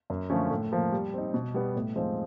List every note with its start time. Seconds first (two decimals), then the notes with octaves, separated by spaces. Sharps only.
0.10 F#2
0.30 D3 F3 A3 C#4
0.51 A2
0.72 F3 A#3
0.92 G3
1.14 C4 D#4
1.34 B2
1.54 G3 B3
1.76 A2
1.96 F3 G#3 C4 D#4